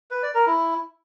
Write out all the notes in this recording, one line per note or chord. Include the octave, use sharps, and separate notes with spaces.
B4
D5
A#4
E4